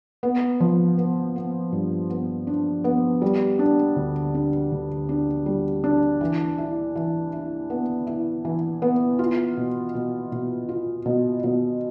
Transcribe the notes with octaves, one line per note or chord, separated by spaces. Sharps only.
B3
F3
B3
B3
G2
B3
D4
B3
G3
D4
D2
D4
D2
D4
G3
D4
E3
E4
E3
E4
B3
E4
E3
B3
F4
B2
B2
B2
F4
B2
B2